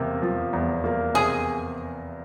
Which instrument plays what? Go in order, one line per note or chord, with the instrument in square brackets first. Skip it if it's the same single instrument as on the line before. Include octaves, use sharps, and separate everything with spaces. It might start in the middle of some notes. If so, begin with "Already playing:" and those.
Already playing: [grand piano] E2 C3 A#3
F3
E2
A#3
[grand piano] C3 [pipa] G#4